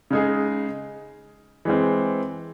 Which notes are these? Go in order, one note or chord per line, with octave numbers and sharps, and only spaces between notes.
C#3 G#3 D#4 G#4
E3 G#3 C4